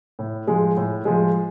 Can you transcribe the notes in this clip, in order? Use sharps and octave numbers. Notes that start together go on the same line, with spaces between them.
A2
F3 G#3
A2
F3 G#3